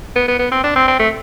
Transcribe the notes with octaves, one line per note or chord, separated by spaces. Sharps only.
B3
B3
B3
C4
D4
C4
C4
A3